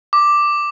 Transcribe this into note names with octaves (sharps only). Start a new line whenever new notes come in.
D6